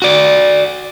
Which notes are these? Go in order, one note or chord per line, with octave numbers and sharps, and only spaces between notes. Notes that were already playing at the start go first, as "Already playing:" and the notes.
F#4 D5